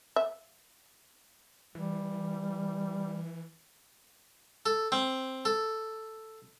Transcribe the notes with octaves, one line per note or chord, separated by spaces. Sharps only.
E5
E3 G3
A4
C4
A4